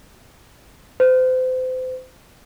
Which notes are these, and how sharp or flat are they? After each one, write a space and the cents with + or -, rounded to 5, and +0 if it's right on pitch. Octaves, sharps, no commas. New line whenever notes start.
C5 -35